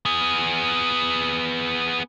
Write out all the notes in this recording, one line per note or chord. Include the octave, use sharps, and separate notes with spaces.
B3 G#4